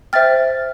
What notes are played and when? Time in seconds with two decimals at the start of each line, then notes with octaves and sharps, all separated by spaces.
0.13 C5 E5 G5 F6 A6